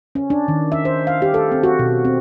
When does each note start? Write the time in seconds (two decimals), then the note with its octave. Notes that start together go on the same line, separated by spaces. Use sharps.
0.15 C#4
0.30 D4
0.48 D#3
0.72 E5
0.85 C5
1.07 F5
1.22 G4
1.34 A4
1.52 C4
1.63 F#4
1.79 B2
2.05 C4